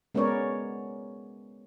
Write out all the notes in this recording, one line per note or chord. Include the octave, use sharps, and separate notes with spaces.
G#3 B3 C#4 A#4 C#5 D5